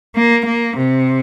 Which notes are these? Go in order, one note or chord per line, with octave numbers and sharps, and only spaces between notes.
A#3
A#3
C3